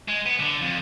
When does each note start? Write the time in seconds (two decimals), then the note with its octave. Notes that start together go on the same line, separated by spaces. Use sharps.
0.09 G#3
0.26 B3
0.40 D3
0.62 F2